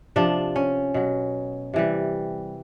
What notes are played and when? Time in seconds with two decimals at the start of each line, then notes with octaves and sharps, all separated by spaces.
0.16 C3 F3 D4
0.56 C#4
0.94 B2 F#3
1.74 C3 E3 G3